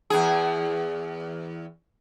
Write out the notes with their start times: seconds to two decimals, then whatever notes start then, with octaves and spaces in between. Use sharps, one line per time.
0.10 E2 G#4